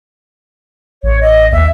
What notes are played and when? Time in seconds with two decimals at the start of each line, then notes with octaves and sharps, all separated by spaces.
1.03 A1 C#5
1.21 D#5
1.52 D#2 E5